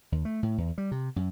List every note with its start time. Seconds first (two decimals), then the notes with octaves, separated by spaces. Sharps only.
0.12 D#2
0.25 A3
0.43 A2
0.58 E2
0.78 G3
0.92 C3
1.16 F#2